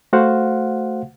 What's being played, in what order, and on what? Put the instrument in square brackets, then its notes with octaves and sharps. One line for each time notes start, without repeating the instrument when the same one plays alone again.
[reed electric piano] A3 F#4 C5 F5 F#5